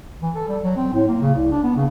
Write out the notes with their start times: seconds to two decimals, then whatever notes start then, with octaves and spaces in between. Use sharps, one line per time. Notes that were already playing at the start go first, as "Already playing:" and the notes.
0.22 E3
0.35 A4
0.48 G3
0.63 F#3
0.77 C4
0.93 A2
1.08 A#3
1.21 C#3
1.35 C2
1.51 D4
1.63 B3
1.76 C#3